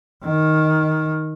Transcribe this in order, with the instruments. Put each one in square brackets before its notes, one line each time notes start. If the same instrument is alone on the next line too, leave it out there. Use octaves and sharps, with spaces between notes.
[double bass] D#3